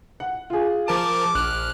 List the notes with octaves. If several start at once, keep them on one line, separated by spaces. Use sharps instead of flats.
F#5
F4 G#4
F3 A#4 A5 D6
A#1 F6 F#6